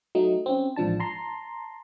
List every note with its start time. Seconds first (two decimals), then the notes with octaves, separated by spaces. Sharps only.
0.15 F#3 A3 D#4
0.46 C4 C#4
0.76 A1 G#2 F3 D4 A5
1.00 A5 A#5 C6